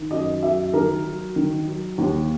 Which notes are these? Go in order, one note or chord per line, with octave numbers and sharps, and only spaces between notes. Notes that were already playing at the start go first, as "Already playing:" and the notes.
Already playing: D#3
F#2 D#5
F#3 E5
D#3 A#4
F#3
D#3
F#3
D#2